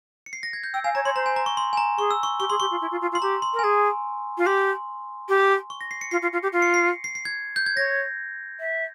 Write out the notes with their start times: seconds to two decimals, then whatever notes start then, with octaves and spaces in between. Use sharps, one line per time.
0.26 C#7
0.33 C7
0.43 A#6
0.53 G#6
0.64 G6
0.74 G5 E6
0.84 F5 G#5
0.95 C#5 A#5
1.05 C#5 C6
1.16 C5 A#5
1.26 G#5
1.36 A#5
1.46 C#6
1.57 C6
1.73 G#5
1.77 A#5
1.98 G#4 C#6
2.11 E6
2.23 C#6
2.40 G4 C#6
2.50 G#4 C6
2.60 G4 C#6
2.71 F4
2.81 E4
2.91 F4
3.01 F4
3.12 F4
3.15 C6
3.22 G4 A#5
3.42 C6
3.54 A#4
3.59 G#5
3.64 G#4 A#5
4.38 F4
4.46 G4 C6
5.29 G4
5.70 C#6
5.81 A#6
5.91 C7
6.01 C#7
6.11 F4 C7
6.22 F4
6.33 F4
6.43 G4
6.53 F4
6.62 C#7
6.74 C7
7.04 C7
7.15 C7
7.25 G#6
7.56 G6
7.66 G#6
7.76 C#5 A#6
8.60 E5